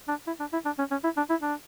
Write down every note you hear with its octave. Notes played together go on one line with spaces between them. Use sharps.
D4
E4
D4
E4
D4
C#4
C#4
E4
D4
E4
D4